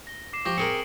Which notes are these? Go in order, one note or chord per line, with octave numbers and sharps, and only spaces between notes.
A#6 G7
D6 C7 E7
F3 G4 C#6 A#6
C4 G#4 A#4 C#7 D7 F#7